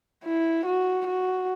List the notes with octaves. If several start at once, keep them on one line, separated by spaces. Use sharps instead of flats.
E4
F#4
F#4